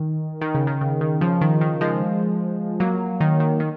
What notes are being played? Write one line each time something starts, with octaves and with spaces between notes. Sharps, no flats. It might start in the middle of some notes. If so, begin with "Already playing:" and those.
Already playing: D#3
D#3
C#3
D#3
C#3
D#3
C#3 F3
D#3
D#3
F3 G#3
F#3 A#3
D#3
D#3
D#3